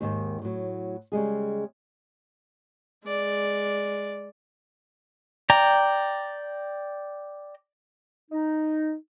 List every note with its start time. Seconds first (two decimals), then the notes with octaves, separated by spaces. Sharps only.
0.01 D#2 G#2 D#3
0.42 A2 F#3
1.12 C#3 G3 G#3 G#4
3.04 G#3 D5
5.50 D5 G5 A#5
8.30 D#4